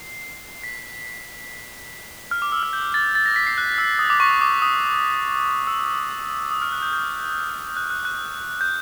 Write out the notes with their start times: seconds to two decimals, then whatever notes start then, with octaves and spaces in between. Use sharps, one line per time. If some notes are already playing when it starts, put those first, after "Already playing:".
Already playing: C7
0.64 B6
2.31 F6
2.42 D6
2.52 E6
2.63 F6
2.73 G6
2.94 A6
3.15 A6
3.26 A#6
3.36 B6
3.47 C7
3.58 F#6
3.78 E6
3.99 D#6
4.10 D6
4.20 C#6
4.31 C#6
4.41 D6
4.62 D#6
5.67 E6
6.51 D#6
6.62 F6
6.72 F#6
6.82 G6
6.93 G6
7.77 F#6
7.91 F#6
8.05 F#6
8.61 G6